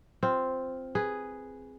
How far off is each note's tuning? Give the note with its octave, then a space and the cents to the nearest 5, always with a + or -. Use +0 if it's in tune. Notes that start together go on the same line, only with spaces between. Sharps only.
C4 +0 F4 +0
G#4 +0 B4 +0